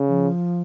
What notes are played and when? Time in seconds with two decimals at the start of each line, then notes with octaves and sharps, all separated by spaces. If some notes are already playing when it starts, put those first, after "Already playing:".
Already playing: C#3
0.08 F3